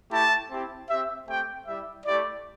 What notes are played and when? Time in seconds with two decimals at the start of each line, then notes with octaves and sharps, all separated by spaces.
0.11 A3 E4 G4 A5
0.50 C4 E4 G4
0.89 C4 G4 E5
1.28 A3 C4 G4 G5
1.67 G3 E4 G4 E5
2.05 A3 E4 G4 D5